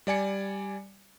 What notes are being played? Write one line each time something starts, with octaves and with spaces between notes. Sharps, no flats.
G3 D5 G#5 C#7